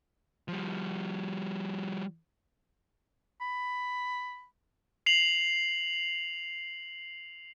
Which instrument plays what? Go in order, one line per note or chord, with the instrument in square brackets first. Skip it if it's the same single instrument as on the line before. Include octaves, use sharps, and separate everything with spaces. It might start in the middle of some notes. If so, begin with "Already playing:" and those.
[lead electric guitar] F3 G3
[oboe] B5
[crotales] C7 F7 F#7